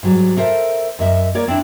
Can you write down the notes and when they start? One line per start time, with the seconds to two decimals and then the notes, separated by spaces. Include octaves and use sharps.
0.03 G#2 F#3 G3
0.37 A4 A#4 C5 D#5 E5
0.99 F#2 D#5 E5
1.34 A#3 A#4 C#5 D5
1.48 C4 D4 E4